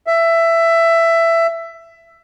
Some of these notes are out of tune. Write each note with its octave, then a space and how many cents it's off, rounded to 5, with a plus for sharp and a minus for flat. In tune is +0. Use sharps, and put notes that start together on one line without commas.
E5 +15